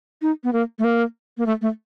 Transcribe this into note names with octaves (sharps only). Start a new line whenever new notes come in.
D#4
B3
A#3
A3
A#3
A#3
A3
A3